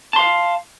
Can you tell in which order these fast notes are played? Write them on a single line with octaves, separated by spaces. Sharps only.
A5 C6 F5